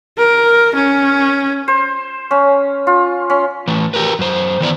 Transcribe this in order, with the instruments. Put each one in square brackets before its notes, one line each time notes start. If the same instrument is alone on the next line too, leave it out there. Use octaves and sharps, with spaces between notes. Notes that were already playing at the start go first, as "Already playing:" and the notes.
[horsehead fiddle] A#4
C#4
[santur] C5
C#4
F4
C#4
[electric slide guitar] E3 A3
G4 A#4 B4
F#2 C5
D#3 E3 B3 E4 C#5 D5